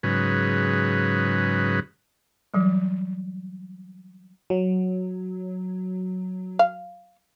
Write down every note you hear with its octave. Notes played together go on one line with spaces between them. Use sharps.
G#2 C#3 F#3 B4
E3 F#3 G3
F#3
F5